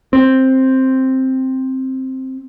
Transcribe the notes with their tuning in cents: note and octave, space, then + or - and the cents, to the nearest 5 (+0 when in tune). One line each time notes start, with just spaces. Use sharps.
C4 +5